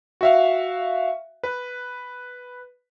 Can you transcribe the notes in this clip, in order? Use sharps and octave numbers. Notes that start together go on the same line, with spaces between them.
F#4 E5 F5
B4